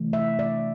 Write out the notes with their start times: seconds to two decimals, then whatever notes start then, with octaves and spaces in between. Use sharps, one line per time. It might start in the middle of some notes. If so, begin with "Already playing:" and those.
Already playing: C3 E3 A3
0.13 E5
0.39 D5